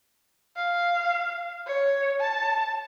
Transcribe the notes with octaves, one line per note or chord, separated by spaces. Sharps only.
F5
C#5
A5